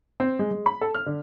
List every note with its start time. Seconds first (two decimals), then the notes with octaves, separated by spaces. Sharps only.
0.20 C4
0.39 G#3
0.51 G#3
0.66 B5
0.81 A4
0.94 F6
1.06 D3